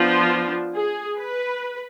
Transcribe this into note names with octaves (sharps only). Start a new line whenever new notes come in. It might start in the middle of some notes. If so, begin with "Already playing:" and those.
Already playing: F3 B3 D4 F4
G#4
B4